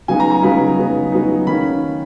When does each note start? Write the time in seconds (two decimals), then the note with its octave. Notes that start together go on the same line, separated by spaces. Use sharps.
0.08 C#3 F#3 B3 D#4 G#5
0.20 A#5
0.32 A#5
0.43 C#3 F#3 B3 D#4 B5
0.77 C#3 F#3 B3 D#4
1.12 C#3 F#3 B3 D#4
1.47 D#3 A#3 C#4 B5